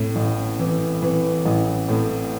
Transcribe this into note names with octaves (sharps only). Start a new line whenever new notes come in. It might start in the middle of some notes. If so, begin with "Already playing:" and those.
Already playing: A2
A1
E3
E3
A1
A2